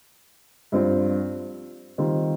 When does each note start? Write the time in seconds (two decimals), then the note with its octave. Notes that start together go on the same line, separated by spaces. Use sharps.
0.72 G2 F3 C4 F4
1.98 D#3 G3 C4 F4